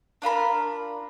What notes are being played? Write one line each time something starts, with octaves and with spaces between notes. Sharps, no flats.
D4 F4 A#4 B5